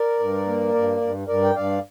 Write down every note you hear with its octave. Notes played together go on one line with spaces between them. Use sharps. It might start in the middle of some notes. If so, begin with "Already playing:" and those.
Already playing: A#4 D5
G2
A#3
G2
G2
G2 A#4 D5
G5
G2 D5 F5